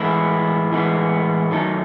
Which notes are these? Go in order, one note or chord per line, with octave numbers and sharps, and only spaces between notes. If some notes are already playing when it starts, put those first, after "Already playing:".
Already playing: A2 E3 G#3 B3 E4
A2 E3 G#3 B3 E4
D#3 F#3 A3 D#4 A4